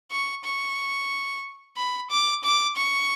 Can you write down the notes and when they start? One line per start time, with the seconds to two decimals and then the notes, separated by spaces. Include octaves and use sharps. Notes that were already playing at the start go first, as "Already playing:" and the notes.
0.11 C#6
0.44 C#6
1.77 B5
2.10 D6
2.44 D6
2.76 C#6